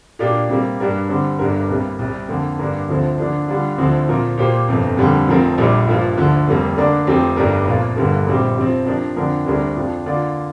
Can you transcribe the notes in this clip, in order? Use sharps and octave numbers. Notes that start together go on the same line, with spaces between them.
A#2 A#3 D4 G4 D5
C3 G3 A#3
G2 G3 D4 A#4 D5
D3 G3 C4
G1 G2 G3 D4 A#4
C2 C3 G3 A#3
C2 C3 G3
F2 D3 A#3
G2 D3 A#3 D4 A#4
D2 D3 F3 C4
D3 F3 A#3 D4
D3 G3 D4 F4
D2 D3 F3 C4
A#2 F3 C4 A#4
A#2 A#3 G4 C5
G1 F2 C3
F2 D3 G3 A#3
F1 F2 F3 C4 A#4
A#1 A#2 G3 D4
G2 F3 A#3 F4
D2 D3 F3
F1 F2 C3 G3 A#3
D3 A#3 D4 A#4 D5
F1 F2 F3 C4 G4
G1 G2 G3 D4 A#4
C2 A#2 F3 A#3 F4
G1 G2 D3 G3 A#3
A#1 A#2 G3 C4 G4
F2 C3 F3 C4
C3 F3 D4 A#4 D5
F2 D3 F3 D4 A#4
D2 C3 G3 D4 A#4
F2 F3 D4 F4
D3 A#3 F4 D5